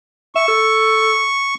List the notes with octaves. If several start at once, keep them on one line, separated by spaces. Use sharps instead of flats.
E5 C#6
A4